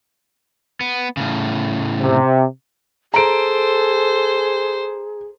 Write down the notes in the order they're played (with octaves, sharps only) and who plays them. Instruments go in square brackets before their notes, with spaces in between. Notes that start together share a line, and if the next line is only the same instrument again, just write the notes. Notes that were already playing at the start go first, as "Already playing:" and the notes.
[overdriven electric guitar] B3
A2 C#3
[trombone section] C3
[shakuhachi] G#4 [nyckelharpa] A4 [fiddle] C5 [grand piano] A#5 D7